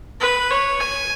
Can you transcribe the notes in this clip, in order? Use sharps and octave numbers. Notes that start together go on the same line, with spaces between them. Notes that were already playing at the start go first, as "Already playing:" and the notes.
B4
C#5
G#5